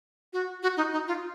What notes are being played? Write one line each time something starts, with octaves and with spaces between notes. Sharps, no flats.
F#4
F#4
D#4
D#4
F4